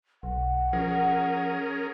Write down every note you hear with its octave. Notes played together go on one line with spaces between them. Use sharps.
B1 F#5
F3 C#4 G#4 A#4